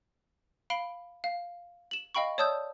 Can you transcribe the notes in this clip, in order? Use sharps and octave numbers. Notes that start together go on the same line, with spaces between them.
F5 B5 D7 G7
F5
E7 F#7
D#5 F5 G5 B5 C#6
C#5 D5 A5 D#6 E6 G6